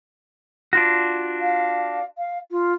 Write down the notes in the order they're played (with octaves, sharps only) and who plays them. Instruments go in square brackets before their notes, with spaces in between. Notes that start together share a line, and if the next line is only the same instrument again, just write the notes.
[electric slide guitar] D4 F4 F#4
[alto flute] F5
F5
F4